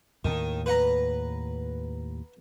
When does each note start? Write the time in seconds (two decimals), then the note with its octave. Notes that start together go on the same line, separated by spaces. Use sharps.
0.25 D#2 A2 D#3
0.66 B4 F#5 A#5